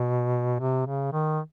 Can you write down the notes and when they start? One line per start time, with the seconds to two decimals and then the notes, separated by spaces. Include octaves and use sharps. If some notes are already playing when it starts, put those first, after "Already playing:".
Already playing: B2
0.60 C3
0.86 C#3
1.12 D#3